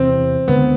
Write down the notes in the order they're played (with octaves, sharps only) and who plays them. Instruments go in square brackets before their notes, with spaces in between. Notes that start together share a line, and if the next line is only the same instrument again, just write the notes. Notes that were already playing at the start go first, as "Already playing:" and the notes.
Already playing: [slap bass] E2 C3 E3 [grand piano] C4
[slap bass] D2 D3 G#3 [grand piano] B3